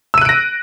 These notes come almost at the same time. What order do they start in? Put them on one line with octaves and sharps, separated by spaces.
E6 D#7 F#6 D7 A#6